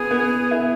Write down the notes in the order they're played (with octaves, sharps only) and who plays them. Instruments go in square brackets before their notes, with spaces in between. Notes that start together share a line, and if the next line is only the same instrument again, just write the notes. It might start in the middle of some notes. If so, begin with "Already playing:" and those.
Already playing: [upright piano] B3 [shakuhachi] G#4
[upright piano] B3
B3 E4